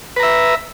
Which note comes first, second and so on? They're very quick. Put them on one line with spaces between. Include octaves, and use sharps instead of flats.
B4 A#5 E5